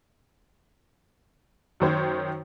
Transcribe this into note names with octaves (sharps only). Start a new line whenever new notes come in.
F#2 D#3 C5 C#5